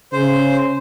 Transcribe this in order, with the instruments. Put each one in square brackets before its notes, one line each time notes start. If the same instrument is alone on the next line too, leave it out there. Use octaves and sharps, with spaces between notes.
[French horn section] C#3 [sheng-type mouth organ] C5